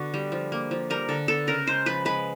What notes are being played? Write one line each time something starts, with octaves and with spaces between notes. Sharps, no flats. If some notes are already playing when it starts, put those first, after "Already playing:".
Already playing: D3 B3 F#4
G3
F3
A#3
F3
G3 A#4
D3 A4
B3 A4
C#3 A#4
G#3 C5
F3 B4
G#3 B4